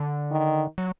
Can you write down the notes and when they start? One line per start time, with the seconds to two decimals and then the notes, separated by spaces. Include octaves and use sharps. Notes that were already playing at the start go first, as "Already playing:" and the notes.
Already playing: D3
0.32 D#3
0.78 F#3